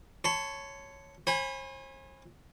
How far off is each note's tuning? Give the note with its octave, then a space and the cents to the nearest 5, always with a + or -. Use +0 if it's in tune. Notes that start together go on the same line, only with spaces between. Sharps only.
C#5 +0 A5 +0 C6 -40
C5 +45 G#5 -15 B5 +0